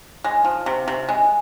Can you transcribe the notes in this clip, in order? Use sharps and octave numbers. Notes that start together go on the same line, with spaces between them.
G#3
F3
C3
C3
G#3